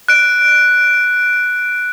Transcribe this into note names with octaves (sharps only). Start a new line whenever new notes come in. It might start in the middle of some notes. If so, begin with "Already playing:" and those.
F#6 D7